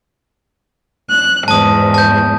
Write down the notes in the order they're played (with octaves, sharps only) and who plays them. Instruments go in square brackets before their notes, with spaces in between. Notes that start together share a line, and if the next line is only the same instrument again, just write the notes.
[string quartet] F#6
[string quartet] E2 G#2 [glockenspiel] A5 D#6
[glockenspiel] A5 G6